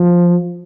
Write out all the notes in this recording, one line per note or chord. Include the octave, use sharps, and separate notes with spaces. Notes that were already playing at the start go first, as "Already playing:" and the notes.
Already playing: F3